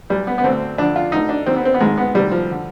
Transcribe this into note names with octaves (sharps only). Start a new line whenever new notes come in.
B1 B2 G3
B3
B3
D2 D3 C4
F2 D3 D4
F4
D2 D3 D#4
D4
D#2 D#3 C4
B3
C4
B3
G#1 G#2 D#3 G#3
B3
D2 C3 D#3 G3
F3
D3